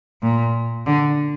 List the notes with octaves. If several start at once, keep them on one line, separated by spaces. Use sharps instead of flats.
A#2
D3